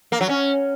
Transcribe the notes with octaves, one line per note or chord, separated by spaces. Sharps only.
A#3
F#3
C#4